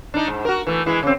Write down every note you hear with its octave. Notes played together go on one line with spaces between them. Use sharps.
D4 D#4
G#2
F#4 A#4
E3 A3
E3 G#3 E4
C#3 C4